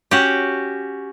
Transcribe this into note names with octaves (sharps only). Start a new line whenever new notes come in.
C#4 F#4 G4